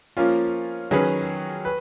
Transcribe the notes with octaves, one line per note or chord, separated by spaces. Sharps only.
F3 A#3 C#4 F4
D#3 F#3 C#4 G#4 B4
B4